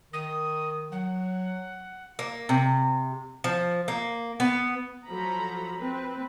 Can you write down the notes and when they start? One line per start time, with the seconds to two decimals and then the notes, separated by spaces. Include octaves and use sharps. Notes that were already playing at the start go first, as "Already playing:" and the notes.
0.13 D#3 D#6
0.91 F#3 F#5
2.19 A#3
2.49 C3
3.44 F3
3.88 A#3
4.40 B3
5.07 F3 F#3 A4 A#5 B5
5.78 C4 B4